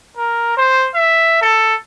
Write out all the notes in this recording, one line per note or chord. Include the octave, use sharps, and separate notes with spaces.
A#4
C5
E5
A4